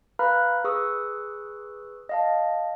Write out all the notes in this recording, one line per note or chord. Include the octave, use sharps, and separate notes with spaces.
B4 F5 A#5 B5 F6 F#6
G#4 B4 C#6 D#6 E6
D#5 F5 A5